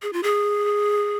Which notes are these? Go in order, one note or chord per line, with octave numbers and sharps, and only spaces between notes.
G#4
F4
G#4